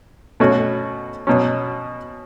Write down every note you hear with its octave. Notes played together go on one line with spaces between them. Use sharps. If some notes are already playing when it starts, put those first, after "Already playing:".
B2 A3 C#4 F#4
B2 F#3 C#4